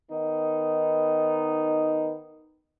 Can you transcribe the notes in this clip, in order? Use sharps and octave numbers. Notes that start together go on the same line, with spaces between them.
D#3 B3 D#4